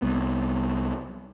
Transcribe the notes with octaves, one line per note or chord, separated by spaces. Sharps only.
C2 B3